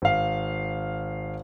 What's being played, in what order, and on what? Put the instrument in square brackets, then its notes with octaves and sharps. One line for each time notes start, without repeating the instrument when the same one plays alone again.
[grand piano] G#1 F5